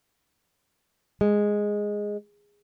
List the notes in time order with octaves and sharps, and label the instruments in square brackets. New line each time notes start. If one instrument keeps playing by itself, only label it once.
[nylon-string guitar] G#3